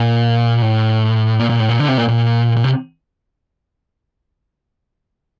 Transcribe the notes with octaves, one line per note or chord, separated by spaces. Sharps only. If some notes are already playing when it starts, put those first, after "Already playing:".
Already playing: A#2
A2
A#2
A#2
A2
A#2
D3
C3
A#2
A#2
A#2
C3